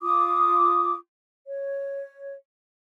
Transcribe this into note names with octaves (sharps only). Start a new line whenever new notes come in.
F4 D6 D#6
C#5